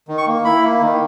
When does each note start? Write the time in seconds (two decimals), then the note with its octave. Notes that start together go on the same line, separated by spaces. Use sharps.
0.08 D#3
0.18 C#6
0.27 A#3
0.45 E4 B5
0.63 A#3
0.81 D#3